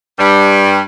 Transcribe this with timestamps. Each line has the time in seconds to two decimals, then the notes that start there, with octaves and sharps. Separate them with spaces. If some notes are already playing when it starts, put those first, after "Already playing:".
0.18 G2 G3